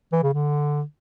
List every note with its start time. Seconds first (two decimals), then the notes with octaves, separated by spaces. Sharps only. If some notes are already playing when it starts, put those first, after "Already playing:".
0.12 E3
0.23 C#3
0.33 D3